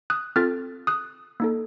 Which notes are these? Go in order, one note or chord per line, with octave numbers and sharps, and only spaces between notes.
D#6 F#6
C4 F4 A4 F6 A6
D#6 F#6
A#3 D#4 A4